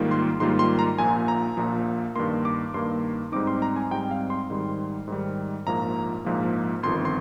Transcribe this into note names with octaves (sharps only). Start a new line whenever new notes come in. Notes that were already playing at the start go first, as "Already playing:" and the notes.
Already playing: G#2 D#3 G3 A#3 F4
C6
G#2 D#3 G3 A#3 F4 C6
C6
A#5
A#1 A#2 F3 G#5
A#5
A#1 A#2 F3
G2 D#3 A#3 C6
D6
G2 D#3 A#3 C6
G#2 G3 C4 D#4 D6
C6
A#5
G#5
G#2 G3 C4 D#4 G5
F5
C6
G#2 D#3 G3
G#2 D#3 G3
A#1 G#2 F3 A#3 A#5
A#1 G#2 F3 A#3
G1 F2 D#3 C6
C6